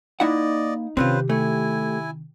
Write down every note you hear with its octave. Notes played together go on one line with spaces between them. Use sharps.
A#3 D#4 E4 D5 D#5 F#5
C3 D#3 C4 C#4 F4 G4 B4 C5
A3 E4 G#5